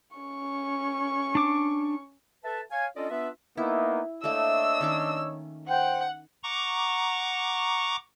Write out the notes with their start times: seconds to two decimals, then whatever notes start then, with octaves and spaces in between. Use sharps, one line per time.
0.16 C#4 C#6
1.35 D4 D6
2.44 A4 B4 E5 A5
2.71 C#5 F5 G#5
2.96 C#4 D4 F4 A4 D5 D#5
3.10 B3 D4 F4 B4 E5
3.57 A#3 B3 D#4 E4
4.24 A3 A#3 D4 C#5 D#5 E6
4.81 D#3 C#4 D6
5.68 C5 F#5 G5
6.43 F#5 A#5 C#6 D6